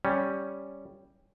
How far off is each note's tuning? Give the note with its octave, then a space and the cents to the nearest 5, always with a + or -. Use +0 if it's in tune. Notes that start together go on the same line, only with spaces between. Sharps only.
G3 +0 C#4 +0